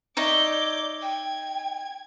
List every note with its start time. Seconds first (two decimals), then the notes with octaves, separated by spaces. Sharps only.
0.17 D#4 C#5 D5 E5 D6 G6
1.02 G5 G#6